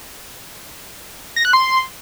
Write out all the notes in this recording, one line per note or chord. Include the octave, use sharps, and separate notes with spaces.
A#6
F#6
C6